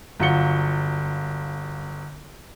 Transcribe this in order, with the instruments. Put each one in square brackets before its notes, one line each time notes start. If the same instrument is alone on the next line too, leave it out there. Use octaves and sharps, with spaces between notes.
[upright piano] G1 F#3 F4 F#4 C#7 G7